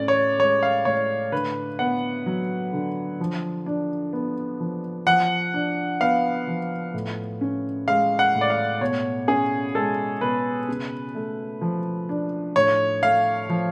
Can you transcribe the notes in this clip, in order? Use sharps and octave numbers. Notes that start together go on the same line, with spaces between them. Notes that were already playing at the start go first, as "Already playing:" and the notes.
Already playing: A2 C#4 D5
C#5
G#3 C#5
F5
A2 C#5
D3 B4
B3 F#5
F#3
D3
F3
D4
B3
F3
F3 F#5
D4
B3 F5
F3
A2
C#4
G#3 F5
F#5
A2
D5
F5
B2 C#5
C#4 G#4
G#3 A4
B2 B4
C#3
A3
F3
D4
A2 C#5
A3 F5
F3